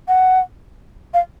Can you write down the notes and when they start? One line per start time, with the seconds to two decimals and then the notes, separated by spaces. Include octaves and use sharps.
0.08 F#5
1.14 F5